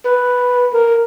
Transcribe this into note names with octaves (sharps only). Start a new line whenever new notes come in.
B4
A#4